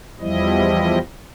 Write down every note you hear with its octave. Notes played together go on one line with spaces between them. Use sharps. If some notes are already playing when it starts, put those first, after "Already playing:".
E2 F3 G3 E4 D#5